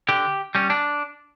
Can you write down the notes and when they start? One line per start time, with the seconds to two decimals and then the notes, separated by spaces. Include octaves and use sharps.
0.09 D3 G4
0.55 G3 C#4
0.70 D4